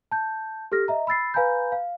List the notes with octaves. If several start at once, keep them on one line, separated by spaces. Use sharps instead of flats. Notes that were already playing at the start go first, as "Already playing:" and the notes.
A5 G6
G4 A4 F6 A#6
D#5 E5 A#5
B5 E6 A6 C7
B4 F5 G#5 A#5 B5 G6
F5